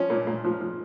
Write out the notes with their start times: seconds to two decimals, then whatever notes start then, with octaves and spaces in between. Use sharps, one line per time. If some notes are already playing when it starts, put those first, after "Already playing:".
Already playing: F3 C#4
0.10 A#2
0.27 A#2
0.44 F3
0.61 F3